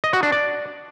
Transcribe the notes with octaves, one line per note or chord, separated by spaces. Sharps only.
D#5
F#4
D4
D5